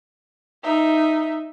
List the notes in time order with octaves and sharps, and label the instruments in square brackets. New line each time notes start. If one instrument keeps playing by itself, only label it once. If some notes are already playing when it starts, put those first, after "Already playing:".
[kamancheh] D#4 E5